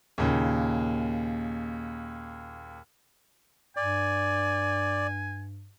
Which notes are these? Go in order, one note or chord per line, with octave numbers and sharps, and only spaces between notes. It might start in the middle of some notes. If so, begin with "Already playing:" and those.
D#2 A#2 C#3
G2 D5 G#5